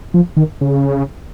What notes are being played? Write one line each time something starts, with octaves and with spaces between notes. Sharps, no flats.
F3
D#3
C#3